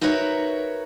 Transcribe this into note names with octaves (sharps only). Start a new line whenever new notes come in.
D#4 F#4 A#4 B4 C#5 E5